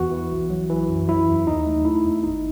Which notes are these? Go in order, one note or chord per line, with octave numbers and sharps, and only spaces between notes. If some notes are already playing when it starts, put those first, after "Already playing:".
Already playing: E2 E3 F#4
E3
B1
F#3
E3
F#2
F#3 E4
E2
D#2 D#4
A3
A3 E4
E2
G#1 D#4